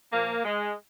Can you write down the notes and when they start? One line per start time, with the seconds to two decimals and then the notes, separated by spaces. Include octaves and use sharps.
0.12 A#2 F3 A#3
0.44 G#3